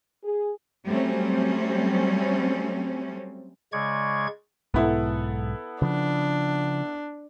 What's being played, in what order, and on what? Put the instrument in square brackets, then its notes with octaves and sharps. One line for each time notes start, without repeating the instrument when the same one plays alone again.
[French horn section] G#4
[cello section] F#3 G3 A3 C4 C#4
[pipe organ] C#3 G#3 D5 C#6 G#6
[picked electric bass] B1 G#2 [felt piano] B3 E4 A4
[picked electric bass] C#3 F3 [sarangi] D4